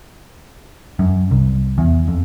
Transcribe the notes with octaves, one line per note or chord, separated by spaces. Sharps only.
F#2
C2
E2
F2